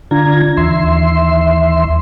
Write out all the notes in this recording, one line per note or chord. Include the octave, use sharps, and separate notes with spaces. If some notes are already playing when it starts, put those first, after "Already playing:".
D3 D4 F4 A#5 G#6
D#2 E3 E5 C6